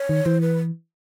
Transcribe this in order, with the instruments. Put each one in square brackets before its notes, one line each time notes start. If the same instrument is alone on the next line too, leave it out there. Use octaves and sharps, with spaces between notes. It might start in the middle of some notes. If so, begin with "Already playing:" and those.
Already playing: [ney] C#5
[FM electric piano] D#3
[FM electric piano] E3 [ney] C5
[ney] B4